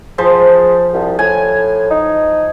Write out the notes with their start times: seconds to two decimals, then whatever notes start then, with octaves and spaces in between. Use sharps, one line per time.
0.18 F3 G#4 C5
0.94 C2
1.19 A2 G#5
1.91 D#4